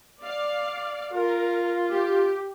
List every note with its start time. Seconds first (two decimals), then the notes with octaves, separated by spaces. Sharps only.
0.21 D5 F5
1.13 F4 A#4
1.90 G4